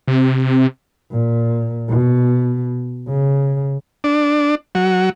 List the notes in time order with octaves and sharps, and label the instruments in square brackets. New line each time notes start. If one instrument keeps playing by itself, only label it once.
[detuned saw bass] C3
[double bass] A#2
B2
C#3
[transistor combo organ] D4
F#3